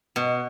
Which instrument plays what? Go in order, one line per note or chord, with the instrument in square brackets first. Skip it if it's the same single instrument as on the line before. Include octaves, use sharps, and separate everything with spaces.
[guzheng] B2